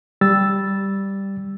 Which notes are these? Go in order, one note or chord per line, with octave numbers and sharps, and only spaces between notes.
G3 E6 A6